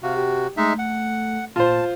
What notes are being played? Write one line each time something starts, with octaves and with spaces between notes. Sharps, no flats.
C3 F#4 F5
G4
G#3 A3 D#4 E5
F#5
A#2 F4 C5 A5